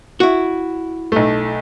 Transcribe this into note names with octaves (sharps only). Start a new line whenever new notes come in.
E4 F#4
B1 A3